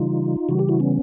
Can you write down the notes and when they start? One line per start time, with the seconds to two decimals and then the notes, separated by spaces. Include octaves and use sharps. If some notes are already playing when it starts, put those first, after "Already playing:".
Already playing: C#3 E3 G3 D#4 F4
0.49 C#3 E3 G3 F#4
0.59 G4
0.69 E4 F#4
0.80 B3 C#4